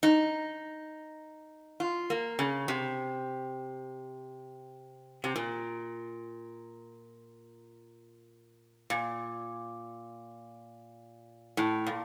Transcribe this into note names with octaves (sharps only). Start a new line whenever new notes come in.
D#4
F4
A#3
C#3
C3
C3
A#2
A#2
A2
A#2